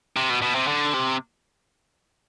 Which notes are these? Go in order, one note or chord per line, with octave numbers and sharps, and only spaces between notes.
C3
B2
B2
C3
D3
C3